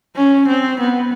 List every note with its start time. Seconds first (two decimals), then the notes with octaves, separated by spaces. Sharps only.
0.16 C#4
0.48 C4
0.80 B3